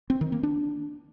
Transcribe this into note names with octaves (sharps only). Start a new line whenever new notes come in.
C4
D#3
A#3
D4